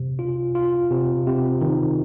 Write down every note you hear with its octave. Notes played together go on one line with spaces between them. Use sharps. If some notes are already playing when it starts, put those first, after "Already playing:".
Already playing: C3
F4
F4
C3
C3
D#3